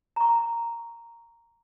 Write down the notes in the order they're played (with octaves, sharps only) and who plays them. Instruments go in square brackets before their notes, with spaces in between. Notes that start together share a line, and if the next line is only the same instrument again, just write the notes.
[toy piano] A#5 C#6